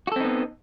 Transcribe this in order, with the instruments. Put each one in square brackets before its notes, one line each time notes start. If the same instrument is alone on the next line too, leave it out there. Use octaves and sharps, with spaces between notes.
[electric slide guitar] F#4
A4
C4
D#4
B3